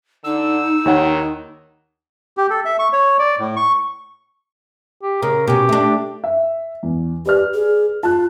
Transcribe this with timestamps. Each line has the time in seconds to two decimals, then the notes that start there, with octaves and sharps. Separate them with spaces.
0.25 D3 D#4 E6
0.86 D#2 D#3 C#5 F#5
2.37 G4
2.50 A4
2.65 E5
2.79 C#6
2.93 C#5
3.19 D5
3.39 A2
3.56 C#6
5.02 G4
5.22 C#3 A#4
5.47 B2 C#4 G4
5.69 A3 D4
6.24 E5
6.83 E2
7.26 G4 B4 D5 F6
7.54 G#4
8.03 F4 A5 F#6